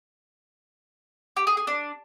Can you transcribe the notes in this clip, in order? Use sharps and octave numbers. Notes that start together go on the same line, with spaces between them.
G4
G#4
G#4
D4